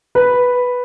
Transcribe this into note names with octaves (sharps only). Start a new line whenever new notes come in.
B4